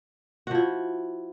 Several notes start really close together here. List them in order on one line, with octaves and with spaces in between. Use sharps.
F#4 F3 E4